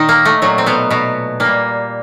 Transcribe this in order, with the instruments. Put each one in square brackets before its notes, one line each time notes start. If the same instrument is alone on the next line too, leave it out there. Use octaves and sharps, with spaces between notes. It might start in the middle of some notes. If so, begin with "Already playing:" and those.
Already playing: [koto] A#2 D#3 D#4
A#3
A3
A#2 F#3 A3
C4
B2 B3
B2 B3
A#2 G3 A#3